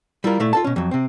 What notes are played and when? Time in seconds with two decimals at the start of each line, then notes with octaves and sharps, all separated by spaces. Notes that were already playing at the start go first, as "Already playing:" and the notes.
0.24 G3 E4 F4 A#4
0.40 A#2 A3 E4
0.53 F4 A4 A5
0.64 B2 C#4
0.76 F2 F#3
0.91 C3 C4